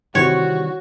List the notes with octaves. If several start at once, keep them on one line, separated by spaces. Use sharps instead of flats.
C3 D#3 E3 G3 E4 F#4 C5 C#5